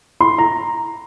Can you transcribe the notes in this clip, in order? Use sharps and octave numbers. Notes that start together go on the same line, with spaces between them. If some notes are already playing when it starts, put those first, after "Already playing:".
C6
A#5